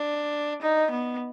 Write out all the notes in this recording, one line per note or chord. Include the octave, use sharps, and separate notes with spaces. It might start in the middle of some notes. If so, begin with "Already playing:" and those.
Already playing: D4
D#4
B3